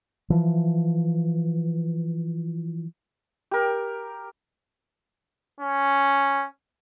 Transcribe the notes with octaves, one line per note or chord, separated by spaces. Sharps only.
E3 F3
G4 A#4
C#4